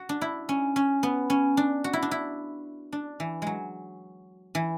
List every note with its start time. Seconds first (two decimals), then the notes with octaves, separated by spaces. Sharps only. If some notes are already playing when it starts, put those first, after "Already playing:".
Already playing: F#4
0.09 D4
0.21 E4
0.49 C#4
0.76 C#4
1.03 B3
1.30 C#4
1.57 D4
1.84 F#4
1.93 E4
2.03 D4
2.11 E4
2.93 D4
3.20 E3
3.42 F#3 G#3
4.55 E3